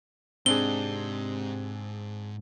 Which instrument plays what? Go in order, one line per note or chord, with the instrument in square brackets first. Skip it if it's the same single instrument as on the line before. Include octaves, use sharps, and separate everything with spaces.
[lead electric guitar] G#2 [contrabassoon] C3 [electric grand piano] C4 D4 G#4 [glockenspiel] G7